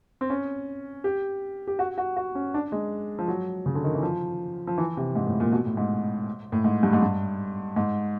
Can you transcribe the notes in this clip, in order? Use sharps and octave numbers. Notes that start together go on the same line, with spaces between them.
C4
C#4
G4
G4
F#4
F#4
F#4
C#4
D4
G#3
F3
F#3
C#3
D3
D#3
E3
F3
F3
E3
C3
G#2
A2
A#2
B2
A2
G#2
A2
G#2
G2
G#2
G2
G#2